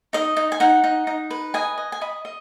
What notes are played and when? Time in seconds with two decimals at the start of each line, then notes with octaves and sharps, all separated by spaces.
0.13 D#4 D#5
0.37 D#4
0.52 G#5
0.60 D#4 F#5
0.84 D#4
1.07 D#4
1.30 B4
1.54 D#5 G#5
1.78 D#5
1.92 G#5
2.01 D#5 B5
2.25 D#5